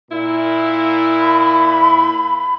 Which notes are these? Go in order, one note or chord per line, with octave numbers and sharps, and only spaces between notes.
A#2 E4
B5